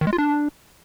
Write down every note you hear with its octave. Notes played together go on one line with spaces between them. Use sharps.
D#3
G#3
F4
D4